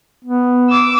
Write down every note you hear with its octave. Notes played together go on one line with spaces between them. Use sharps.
B3
D6 E6